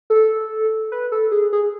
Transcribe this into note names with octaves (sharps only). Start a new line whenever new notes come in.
A4
B4
A4
G#4
G#4